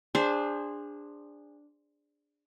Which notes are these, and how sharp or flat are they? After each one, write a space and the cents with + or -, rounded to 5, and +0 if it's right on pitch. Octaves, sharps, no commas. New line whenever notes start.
D4 +0 G#4 -25 C5 +0